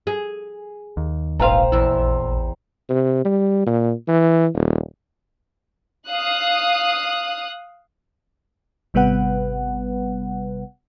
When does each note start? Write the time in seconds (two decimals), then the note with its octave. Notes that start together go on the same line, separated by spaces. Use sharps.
0.07 G#4
0.97 D#2
1.39 E1 A#1 G#2 B4 C5 F5 G5 A#5
1.72 A1 E2 E4
2.90 C3
3.25 G3
3.66 A#2
4.08 E3
4.54 D#1
6.09 F5 D#6 F#6
8.94 G#1 C3 G3 B3 B4 F#5